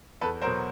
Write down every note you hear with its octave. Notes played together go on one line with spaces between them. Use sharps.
E2 A4 B4
B2 F#3 A#4 C5